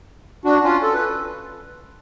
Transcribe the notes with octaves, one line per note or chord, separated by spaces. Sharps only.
D4 F#4
C#4 F4
A4
B4